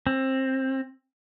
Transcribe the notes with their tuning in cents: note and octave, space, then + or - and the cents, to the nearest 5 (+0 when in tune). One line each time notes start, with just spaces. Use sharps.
C4 +20